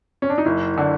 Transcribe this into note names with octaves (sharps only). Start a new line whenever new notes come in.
C#4
D4
D#4
F#1 E4
D3